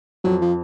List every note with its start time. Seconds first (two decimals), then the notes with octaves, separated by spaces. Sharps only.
0.24 F2 F#3
0.42 F3